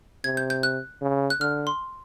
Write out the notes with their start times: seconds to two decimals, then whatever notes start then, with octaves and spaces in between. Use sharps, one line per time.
0.24 C3 G#6
0.37 G6
0.50 G6
0.63 F#6
1.02 C#3
1.30 F#6
1.40 D3 F6
1.67 C6